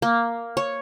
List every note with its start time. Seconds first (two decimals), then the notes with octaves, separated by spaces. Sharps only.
0.02 A#3
0.57 C#5